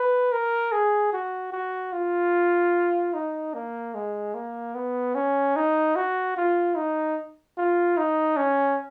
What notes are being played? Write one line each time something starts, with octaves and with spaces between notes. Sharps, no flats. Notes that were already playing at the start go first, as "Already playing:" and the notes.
Already playing: B4
A#4
G#4
F#4
F#4
F4
D#4
A#3
G#3
A#3
B3
C#4
D#4
F#4
F4
D#4
F4
D#4
C#4